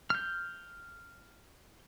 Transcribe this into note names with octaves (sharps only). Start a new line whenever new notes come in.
F6 G6